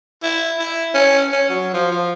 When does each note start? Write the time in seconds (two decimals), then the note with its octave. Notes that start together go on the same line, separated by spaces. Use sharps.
0.23 E4
0.59 E4
0.95 C#4
1.32 C#4
1.49 F#3
1.73 F3
1.91 F3